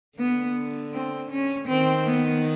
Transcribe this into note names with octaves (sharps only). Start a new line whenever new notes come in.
D3 B3
C4
C#4
D#3 C4
B3